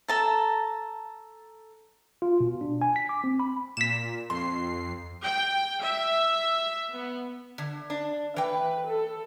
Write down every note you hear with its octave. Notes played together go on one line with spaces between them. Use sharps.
A4 A5 A#5
F4
B2
D4
G#5
B6
D6
C4
B5
A#2 B6 E7
F2 C6 C7
G5
E5
B3
D3
D4
E3 B4 G5
A4